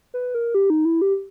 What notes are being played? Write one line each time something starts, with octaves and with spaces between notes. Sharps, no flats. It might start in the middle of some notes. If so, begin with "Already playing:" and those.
B4
A#4
G4
D#4
E4
G4